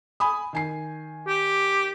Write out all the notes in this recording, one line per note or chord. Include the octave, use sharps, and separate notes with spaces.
G#5 B5 D#6
D#3 G#5 C7
G4